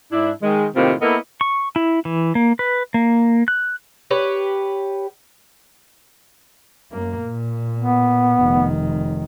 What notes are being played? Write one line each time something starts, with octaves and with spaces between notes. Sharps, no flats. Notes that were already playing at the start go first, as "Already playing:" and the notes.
G#2 D4 E4
D#3 G#3
A2 C3 D#3 A#3 C4 F4
A#3 B3 E4 A4 A#4 D#5
C#6
E4
E3
A#3
B4
A#3
F#6
G4 B4 C#5
F#2 A#3
A#2
B3
F1 D#3